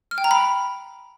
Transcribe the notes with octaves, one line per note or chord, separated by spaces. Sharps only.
F6
G5
A#5
B5